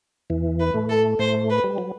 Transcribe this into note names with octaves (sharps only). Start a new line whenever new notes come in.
E2 E3
B4
A2 A3
A4
A2 A3 C5
B4
G3
F#3